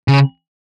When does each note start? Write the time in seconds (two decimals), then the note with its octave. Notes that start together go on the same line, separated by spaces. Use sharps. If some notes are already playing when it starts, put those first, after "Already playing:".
0.08 C#3